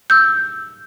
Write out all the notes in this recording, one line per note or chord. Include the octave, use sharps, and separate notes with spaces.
E6 G6